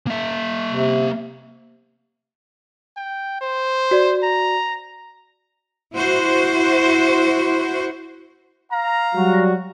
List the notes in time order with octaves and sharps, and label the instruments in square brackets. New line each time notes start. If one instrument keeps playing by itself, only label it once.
[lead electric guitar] A#3 E5
[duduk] C3
[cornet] G5
C5
[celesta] F#4 D5
[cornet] A#5
[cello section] E4 F#4 C5
[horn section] F5 A#5
[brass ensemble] F#3 G3 F#4